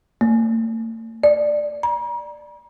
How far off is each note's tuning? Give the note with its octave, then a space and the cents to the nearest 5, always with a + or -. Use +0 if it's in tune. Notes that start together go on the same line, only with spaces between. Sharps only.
A3 +45
D5 +10
A#5 +40